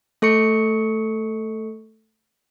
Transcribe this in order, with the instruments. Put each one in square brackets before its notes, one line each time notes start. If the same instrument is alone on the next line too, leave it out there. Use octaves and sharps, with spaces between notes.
[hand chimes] A3 A4 C#6 C#7